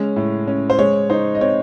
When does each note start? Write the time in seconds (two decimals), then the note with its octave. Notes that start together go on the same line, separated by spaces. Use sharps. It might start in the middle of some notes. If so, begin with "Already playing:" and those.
Already playing: G#3 C#4
0.16 A2
0.48 C#4
0.70 C5
0.79 G#3 C#5
1.10 D#4 C5
1.35 D#5
1.41 C4 C#5